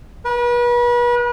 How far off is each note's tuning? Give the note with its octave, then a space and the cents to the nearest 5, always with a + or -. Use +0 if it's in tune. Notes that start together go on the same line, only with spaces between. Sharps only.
B4 -35